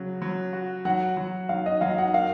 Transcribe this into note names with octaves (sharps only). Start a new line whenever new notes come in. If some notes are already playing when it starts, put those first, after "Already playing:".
Already playing: C#3 F#3
F#3
F#4
F#3 F#5
F#3
F#3 F5
D#5
F#3 F5
F#5
A#3 F5